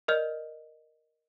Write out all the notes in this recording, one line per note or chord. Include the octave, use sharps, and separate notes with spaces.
A#4 D5 D#5 F6 G6